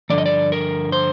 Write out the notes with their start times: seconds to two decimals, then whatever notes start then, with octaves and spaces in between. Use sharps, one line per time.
0.10 G2 D3 F3 D5
0.18 D#5
0.26 D5
0.52 A#4
0.92 C5